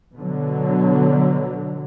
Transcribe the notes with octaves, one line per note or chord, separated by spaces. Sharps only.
B2 D3 F#3